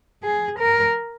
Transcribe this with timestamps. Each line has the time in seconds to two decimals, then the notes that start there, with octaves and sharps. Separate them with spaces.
0.24 G#4
0.59 A#4